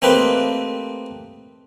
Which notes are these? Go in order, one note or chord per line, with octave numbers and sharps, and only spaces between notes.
A3 A#3 C4 D#4 G4 B4